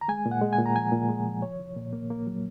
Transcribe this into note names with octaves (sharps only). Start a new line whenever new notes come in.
A#5
G#3 G#5
A#2
F#5
G#3
G#5
A#2
A#5
F3 G#5
A#2
G#3
F3
C2 C#5
C2
A#2
A#3
A#3
F#3